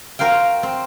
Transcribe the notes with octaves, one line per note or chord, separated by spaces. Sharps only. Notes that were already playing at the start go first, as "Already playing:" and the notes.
F#4 A#4 C5 F5 G5
C4